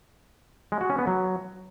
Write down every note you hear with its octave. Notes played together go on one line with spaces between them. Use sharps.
G#3
F#4
C#4
B3
F#3